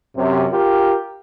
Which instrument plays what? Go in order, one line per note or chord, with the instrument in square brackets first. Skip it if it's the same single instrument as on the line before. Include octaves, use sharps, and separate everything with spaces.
[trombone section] F#2 C3
F4 G4 A#4